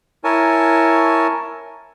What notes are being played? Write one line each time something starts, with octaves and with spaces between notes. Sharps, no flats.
E4 A#4 C#5 G#5 A5